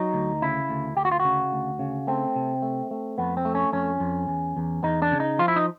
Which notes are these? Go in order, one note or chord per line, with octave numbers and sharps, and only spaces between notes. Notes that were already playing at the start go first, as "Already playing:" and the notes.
Already playing: F#3 D#4
D2
C#3 E4
D2
D2 G4
F#4
F4
C#3 F#4
D2
C#3
A3 C4
C3
A3
A3
F2 B3
C4
A3
C#4
F2 C#4
F2
E2
E2
E2 D#4
D4
C#3
D#4
F3 F4
E4
D#4